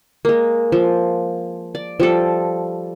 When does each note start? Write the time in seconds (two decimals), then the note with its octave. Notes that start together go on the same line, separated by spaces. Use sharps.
0.25 G#3 A#3
0.72 F3
1.75 D5
2.00 F3 G3 A4